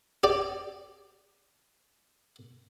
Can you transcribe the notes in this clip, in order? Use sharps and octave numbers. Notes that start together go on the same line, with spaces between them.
G4 D5